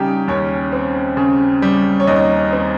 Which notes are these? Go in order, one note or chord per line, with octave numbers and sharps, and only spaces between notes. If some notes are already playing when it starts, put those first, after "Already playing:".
Already playing: C#3 G3 D#4 G4 G5
D#2 C#4 C#5
C4
C#3
G3
C#5
D#2 D#4 D#5
C4